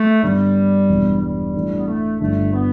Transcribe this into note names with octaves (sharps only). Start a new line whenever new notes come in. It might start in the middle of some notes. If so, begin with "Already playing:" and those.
Already playing: A3
G2 D3 G3 B3 D4
E1 E2 B2 B3 D4
G3
A2 E3 A3 D4
B3
A3
G1 G2 D3 A3
B3